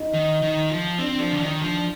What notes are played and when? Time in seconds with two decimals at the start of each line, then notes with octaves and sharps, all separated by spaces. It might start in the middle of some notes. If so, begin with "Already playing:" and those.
Already playing: D#4
0.13 D#3
0.42 D#3
0.70 F3
0.99 C4 D4
1.19 F3
1.31 D3
1.41 D#3 D4
1.62 F3